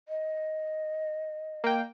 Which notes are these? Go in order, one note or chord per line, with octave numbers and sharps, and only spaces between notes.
D#5
A#3 G5